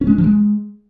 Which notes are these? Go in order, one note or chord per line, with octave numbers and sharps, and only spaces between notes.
C#4
G#3
D4
F3
G#3